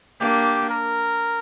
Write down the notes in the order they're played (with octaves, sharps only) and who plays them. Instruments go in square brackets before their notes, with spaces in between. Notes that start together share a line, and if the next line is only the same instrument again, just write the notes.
[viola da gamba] A#3 D4 [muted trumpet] G4
[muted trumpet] A#4